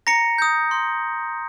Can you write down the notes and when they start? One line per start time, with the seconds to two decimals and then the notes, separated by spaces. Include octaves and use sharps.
0.07 A#5 A#6 C#7
0.38 D#6 G6
0.71 C6